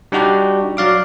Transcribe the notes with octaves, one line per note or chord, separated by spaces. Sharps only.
G3 D4 D#4 F#4 G4
F#3 D5 F5 D6